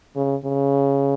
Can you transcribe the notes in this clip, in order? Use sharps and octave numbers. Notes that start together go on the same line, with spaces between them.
C#3
C#3